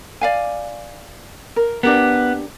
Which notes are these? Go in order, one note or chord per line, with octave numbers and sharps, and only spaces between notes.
D5 F5 G#5
A#4
B3 D4 G4 A#4